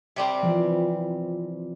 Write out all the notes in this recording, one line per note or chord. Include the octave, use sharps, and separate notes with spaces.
C3 G3 C4
E3 F3